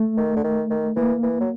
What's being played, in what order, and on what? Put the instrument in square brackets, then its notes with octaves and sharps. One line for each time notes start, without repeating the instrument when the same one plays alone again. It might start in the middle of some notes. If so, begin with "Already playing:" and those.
Already playing: [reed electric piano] A3
[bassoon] D#3
D3
D#3
D#3
[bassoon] E3 [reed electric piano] A#3
[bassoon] E3
F#3